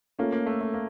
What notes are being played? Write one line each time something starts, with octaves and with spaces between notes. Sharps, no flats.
A3 A#3 C#4 F4
A#3
A3
A3
A#3